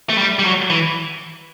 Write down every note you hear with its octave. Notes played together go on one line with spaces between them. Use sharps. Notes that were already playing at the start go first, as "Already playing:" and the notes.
A3
G3
G3
F#3
E3